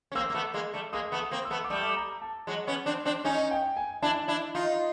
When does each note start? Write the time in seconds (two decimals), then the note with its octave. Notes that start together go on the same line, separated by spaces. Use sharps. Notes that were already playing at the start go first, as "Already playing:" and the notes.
0.12 C#4
0.15 A#3 C4 E6
0.30 A#3
0.34 A3 B3
0.54 G#3 A#3
0.74 G3 A3
0.93 G#3 A#3 D#6
1.12 A3 B3
1.19 D#6
1.31 A#3 C4
1.45 E6
1.50 A3 B3
1.65 D6
1.70 G3 A3 D#6
1.97 A#5
2.22 A5
2.47 F#3 G#3
2.67 B3 C#4
2.86 C4 D4
3.05 C4 D4
3.24 C#4 D#4 G#5
3.51 G5
3.77 G#5
4.02 D4 E4 A5
4.28 D4 E4
4.55 D#4 F4